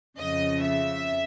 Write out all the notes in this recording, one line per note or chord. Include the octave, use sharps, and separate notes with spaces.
F2 C#3 F3 D#5
E5